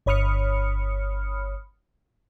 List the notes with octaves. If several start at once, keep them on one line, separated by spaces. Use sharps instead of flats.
G1 C#5 B5 D#6 F6 C#7